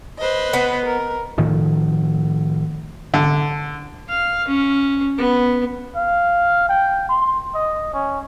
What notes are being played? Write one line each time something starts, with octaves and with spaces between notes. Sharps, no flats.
B4 C5 D#5
B3
A#4
A2 D#3 F3
D3
F5
C#4
B3
F5
G5
C6
D#5
C#4